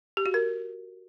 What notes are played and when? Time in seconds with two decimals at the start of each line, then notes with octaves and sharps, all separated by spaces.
0.17 G4
0.26 F#4
0.34 A#4